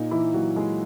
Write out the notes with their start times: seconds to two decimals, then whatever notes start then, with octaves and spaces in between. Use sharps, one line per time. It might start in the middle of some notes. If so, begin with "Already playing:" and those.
Already playing: A#2 D#4
0.11 E3 E4
0.34 A#2 F#3 F#4
0.56 G#3 G#4